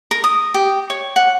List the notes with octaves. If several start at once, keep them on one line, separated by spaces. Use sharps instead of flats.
A#4
D#6
G4
C#5
F#5